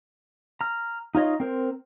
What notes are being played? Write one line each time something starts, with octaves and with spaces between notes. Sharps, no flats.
A#5 F6
D#4 F4 C#5 D#5
C4 A#4 C5